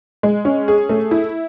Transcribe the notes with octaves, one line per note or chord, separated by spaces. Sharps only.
G#3
C#4
G#4
A3
E4